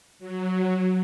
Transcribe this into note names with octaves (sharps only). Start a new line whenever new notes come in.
F#3